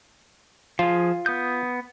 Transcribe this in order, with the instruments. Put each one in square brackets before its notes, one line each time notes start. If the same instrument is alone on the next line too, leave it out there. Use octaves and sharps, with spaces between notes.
[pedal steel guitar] F3 G#4 [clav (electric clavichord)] F4
[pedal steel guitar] B3 D#6 G6